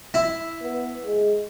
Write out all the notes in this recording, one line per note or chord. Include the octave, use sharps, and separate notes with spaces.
E4
B3
G#3